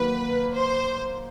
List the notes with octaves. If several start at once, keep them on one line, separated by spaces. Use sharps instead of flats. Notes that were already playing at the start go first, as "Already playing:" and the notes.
Already playing: D#3 F#3 A#3 B4
C5